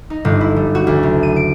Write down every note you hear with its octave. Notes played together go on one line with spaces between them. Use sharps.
D#4
G1
E4
G3
F#4
D2
F#1
D#7
D7